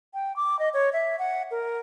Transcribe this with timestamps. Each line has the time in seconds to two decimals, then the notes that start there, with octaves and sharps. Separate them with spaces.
0.14 G5
0.36 D6
0.59 D#5
0.74 C#5
0.93 E5
1.19 F#5
1.51 A#4